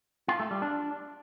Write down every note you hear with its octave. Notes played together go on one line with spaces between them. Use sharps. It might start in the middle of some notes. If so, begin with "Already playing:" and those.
F4
A3
G3
D4